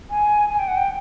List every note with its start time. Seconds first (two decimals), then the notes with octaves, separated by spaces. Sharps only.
0.10 G#5
0.49 G#5
0.59 G5
0.68 F#5
0.77 G5